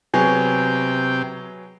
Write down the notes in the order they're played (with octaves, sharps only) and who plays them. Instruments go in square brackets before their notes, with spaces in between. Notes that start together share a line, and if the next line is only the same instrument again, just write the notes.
[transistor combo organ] C3 G5 [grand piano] F#3 B3 G#4